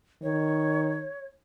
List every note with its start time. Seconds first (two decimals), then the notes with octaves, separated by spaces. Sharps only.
0.23 D#3 C#5